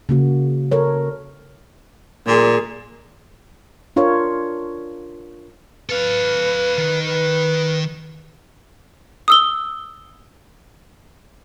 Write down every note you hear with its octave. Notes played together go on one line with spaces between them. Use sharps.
C#3 A#3 F#4
A4 A#4 C#5
A#2 G#4
D4 F4 A#4 C#5
A4 B4 F5
D#3
B4
D#6 E6 G7